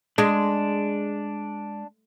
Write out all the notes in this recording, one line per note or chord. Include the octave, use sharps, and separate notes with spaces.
G#3 D4